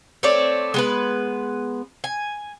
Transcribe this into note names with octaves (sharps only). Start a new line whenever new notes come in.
A3 C4 C#5 D5
G#3 B3 B4
G#5